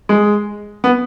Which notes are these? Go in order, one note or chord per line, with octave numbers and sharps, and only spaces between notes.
G#3
B3